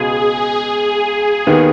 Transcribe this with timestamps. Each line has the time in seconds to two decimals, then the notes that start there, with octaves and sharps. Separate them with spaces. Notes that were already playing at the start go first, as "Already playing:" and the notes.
Already playing: C#2 B2 G#3 G#4
1.47 D#2 D#3 B3